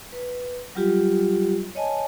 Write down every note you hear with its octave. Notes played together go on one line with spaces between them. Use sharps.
B4
F#3 G3 F4 G4
C#5 D#5 G#5 A5